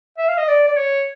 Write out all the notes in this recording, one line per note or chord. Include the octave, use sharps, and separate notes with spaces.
E5
F5
D#5
D5
D5
C#5